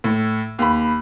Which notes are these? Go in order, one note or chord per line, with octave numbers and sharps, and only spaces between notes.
A2
D#2 B5